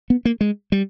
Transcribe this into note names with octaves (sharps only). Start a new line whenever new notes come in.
B3
A#3
G#3
G3